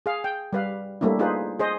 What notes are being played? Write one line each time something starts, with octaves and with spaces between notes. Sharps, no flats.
G#4 F5
G5
G3 B4 F5
G3 A3 A#3 D4 E4
D#4 F4 G#4 B4 C5
G#4 C5 D#5